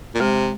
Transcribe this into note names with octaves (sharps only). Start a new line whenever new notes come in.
A#2
C3 G#3